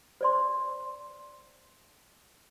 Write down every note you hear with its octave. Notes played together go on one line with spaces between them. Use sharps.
C5 D5 C6